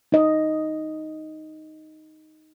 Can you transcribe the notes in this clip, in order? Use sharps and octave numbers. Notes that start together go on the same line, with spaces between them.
D#4 D#5